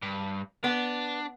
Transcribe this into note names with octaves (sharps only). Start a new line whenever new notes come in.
G2
B3 D4